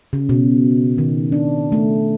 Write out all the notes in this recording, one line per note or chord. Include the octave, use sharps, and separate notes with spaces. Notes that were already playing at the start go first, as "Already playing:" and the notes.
C#3
B2
D#3
D4
A3